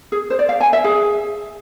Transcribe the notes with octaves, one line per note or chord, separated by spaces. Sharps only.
G#4
C5
D5
F5
G#5
E5
G#4